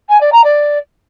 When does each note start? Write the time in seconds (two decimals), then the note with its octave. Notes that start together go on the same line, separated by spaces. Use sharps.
0.09 G#5
0.20 D5
0.32 A#5
0.43 D5